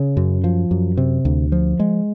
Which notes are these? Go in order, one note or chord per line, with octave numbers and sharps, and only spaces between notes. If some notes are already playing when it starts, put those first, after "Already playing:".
Already playing: C#3
F#2
F3
F#2
C3
D2
F3
G#3